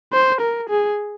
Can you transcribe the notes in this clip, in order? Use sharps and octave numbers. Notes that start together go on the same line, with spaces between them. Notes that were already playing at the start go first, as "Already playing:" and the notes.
C5
A#4
G#4